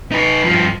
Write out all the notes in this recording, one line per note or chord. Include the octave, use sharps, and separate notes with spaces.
D#4 B4
G2 F3